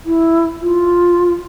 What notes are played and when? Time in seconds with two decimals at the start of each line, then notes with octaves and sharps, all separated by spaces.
0.06 E4
0.61 F4